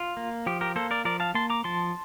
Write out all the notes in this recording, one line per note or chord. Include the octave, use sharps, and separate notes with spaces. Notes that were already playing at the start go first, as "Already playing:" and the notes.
Already playing: F4
A#3
F3 G4
G4 A#4
A#3 A4 C5
A#4 D5
F3 A#4 D5
F5 A5
A#3 A5 C6
A#5 D6
F3 A5 C6